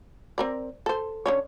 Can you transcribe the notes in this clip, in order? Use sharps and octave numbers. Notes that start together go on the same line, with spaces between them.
C4 A#4 D5
A4 C5
D3 C#4 C#5